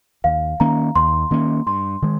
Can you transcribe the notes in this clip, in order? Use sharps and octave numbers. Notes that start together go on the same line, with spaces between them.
D#2 F5
D#3 A#3 C#4 A#5
D#2 C6
D#3 A#3 C#4
G2 C6
D#3 G#3